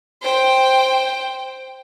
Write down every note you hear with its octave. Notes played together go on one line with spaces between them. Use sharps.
C5 G5